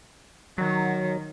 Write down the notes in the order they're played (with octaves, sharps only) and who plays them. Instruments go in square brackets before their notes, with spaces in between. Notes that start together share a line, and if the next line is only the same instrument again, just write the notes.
[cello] D#3 [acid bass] F#3